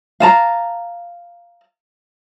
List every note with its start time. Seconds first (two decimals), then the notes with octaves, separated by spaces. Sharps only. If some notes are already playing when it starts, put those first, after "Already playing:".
0.20 F5 A5 A#5